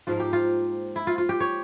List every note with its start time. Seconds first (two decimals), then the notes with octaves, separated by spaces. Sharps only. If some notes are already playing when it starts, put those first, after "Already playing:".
0.07 G#2 F3 A#3 F4
0.20 G4
0.33 F4
0.96 E4
1.07 F4
1.18 F4
1.29 G4
1.40 C#5